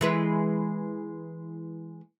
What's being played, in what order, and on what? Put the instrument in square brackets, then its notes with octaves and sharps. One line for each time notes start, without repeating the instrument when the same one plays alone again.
[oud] E3 G#3 B4